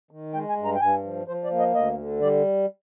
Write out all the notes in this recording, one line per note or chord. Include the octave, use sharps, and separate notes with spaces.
D#3
G#3 G5
G#5
G2
A#5
G5
G2 G#5
F3
F3 C5
D5
A#3
D#5
D2 D#5
D3
G3 D5